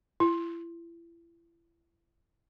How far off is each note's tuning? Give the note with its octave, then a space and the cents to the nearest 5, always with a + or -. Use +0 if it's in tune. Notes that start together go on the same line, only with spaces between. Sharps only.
E4 +35